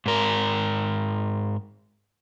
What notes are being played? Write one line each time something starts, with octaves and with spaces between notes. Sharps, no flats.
G#2 A#4